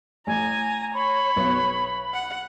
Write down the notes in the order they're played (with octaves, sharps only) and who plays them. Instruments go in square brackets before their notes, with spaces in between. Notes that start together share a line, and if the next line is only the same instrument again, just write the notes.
[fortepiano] A1 [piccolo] G#5 [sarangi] A#5
[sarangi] C#5 [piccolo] B5
[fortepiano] B1 B3
[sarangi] F#5